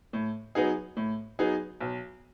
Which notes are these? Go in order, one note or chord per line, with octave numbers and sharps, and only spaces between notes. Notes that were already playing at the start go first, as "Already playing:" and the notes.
A2
F#3 B3 D#4 G#4
A2
F#3 B3 D#4 G#4
B1